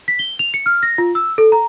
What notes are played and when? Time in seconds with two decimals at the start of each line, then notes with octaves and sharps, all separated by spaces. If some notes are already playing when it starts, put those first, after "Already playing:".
0.08 B6
0.19 G7
0.39 F7
0.54 C#7
0.66 F6
0.83 A#6
0.98 F4
1.15 E6
1.38 A4
1.52 A#5